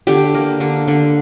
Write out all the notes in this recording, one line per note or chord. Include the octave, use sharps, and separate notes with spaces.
D3 G4
A#3
D3
D3